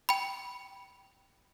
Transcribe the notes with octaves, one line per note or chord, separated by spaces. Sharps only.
G5 B5